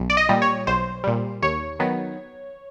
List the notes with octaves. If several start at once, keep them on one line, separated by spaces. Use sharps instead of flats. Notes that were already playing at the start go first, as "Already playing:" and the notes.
Already playing: B1
D5
D#5
A#2 G3
C#5
B1 C5
A#2 G3
D#2 C#5
D#3 F#3 B3